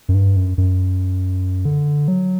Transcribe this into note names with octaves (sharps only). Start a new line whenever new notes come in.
F#2
G2
F#2
F#2
D3
F#3